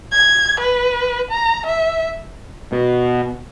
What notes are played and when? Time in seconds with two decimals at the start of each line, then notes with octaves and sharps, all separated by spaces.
0.12 G#6
0.60 B4
1.31 A#5
1.66 E5
2.72 B2